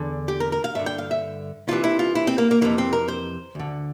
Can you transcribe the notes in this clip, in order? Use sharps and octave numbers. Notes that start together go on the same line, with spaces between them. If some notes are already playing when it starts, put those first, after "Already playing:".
Already playing: E2 D3
G4
A#4
A#4
F5
G2 D3 E5
G5
F5
E5
C2 C3 E3 F4
E4
F4
E4
C4
A#3
A#3
F2 C3 E3 A#3
C4
A#4
C5
D2 D3